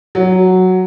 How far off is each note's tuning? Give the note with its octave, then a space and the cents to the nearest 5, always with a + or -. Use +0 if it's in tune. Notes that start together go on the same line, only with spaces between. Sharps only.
F#3 +0